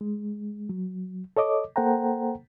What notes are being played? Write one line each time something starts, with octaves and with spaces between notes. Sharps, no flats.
G#3
F#3
A4 C#5 D#5 D6
A#3 A4 C5 F#5 G5 A#5